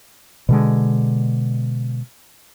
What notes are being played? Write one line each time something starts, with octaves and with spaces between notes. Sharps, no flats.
B2 D3 G#3